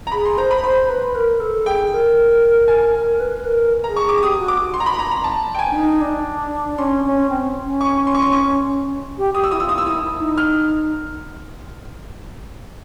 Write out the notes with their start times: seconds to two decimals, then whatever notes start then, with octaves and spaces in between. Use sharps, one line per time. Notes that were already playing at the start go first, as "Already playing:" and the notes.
0.07 A#5
0.12 G#4 B5
0.25 C6
0.38 C5 A#5
0.51 B5
0.63 C5 B5
0.89 B4
1.15 A#4
1.40 A4
1.66 G#4 G5
1.92 A#4
2.68 G#5
3.20 B4
3.45 A#4
3.84 A#5
3.88 G#4
3.96 C#6
4.06 G#4 D6
4.18 D6
4.22 G4 D#6
4.39 F#4
4.48 D6
4.74 C6
4.80 A#5
4.86 B5
4.99 A#5
5.11 A#5
5.24 A5
5.54 G5
5.59 G#5
5.71 D4
5.75 D#4
6.01 D4
6.78 C#4 C6
7.05 C#4
7.30 C4
7.64 C#4
7.81 C#6
8.07 C6
8.14 C#6
8.22 C6
8.32 C#6
9.18 G4
9.34 G4 D#6
9.44 E6
9.51 E4 D#6
9.60 F4 E6
9.69 D#6
9.78 E6
9.85 E4 D#6
10.04 E4
10.20 D#4
10.38 F6